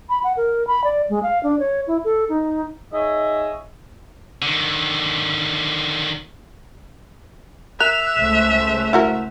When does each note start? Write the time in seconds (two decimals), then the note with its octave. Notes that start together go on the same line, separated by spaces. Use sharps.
0.09 B5
0.24 F#5
0.37 A#4
0.67 B5
0.84 D5
1.09 G#3
1.23 F5
1.43 D4
1.60 C#5
1.87 E4
2.04 A4
2.29 D#4
2.92 D#4 G#4 C#5 D#5 E5
4.42 D3 D#3
7.80 A#4 E5 F#6 F7
8.17 C#2 A3 C5
8.93 E4 F#4 A#4